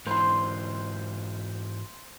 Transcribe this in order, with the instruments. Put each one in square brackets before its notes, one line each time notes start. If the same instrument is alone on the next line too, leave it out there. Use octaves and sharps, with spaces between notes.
[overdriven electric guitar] G#2 E3 [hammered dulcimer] C5 C6